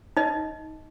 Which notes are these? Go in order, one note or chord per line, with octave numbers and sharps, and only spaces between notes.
D#4 D#5